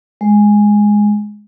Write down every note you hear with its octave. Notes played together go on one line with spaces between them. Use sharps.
G#3